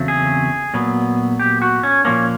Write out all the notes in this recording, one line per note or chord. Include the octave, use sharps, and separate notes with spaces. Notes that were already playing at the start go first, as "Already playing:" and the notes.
Already playing: E2 C#3 F#3 A3 C4
G#4
A#2 F#3 B3
G4
F#4
C#4
A#2 F3 A#3 C#4